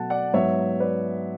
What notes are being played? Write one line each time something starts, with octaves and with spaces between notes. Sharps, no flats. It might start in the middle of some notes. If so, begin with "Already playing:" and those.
Already playing: B2 F#3 A3 F#5 A5
D5 F#5
G#2 F#3 B3 C#5 E5
B4 D5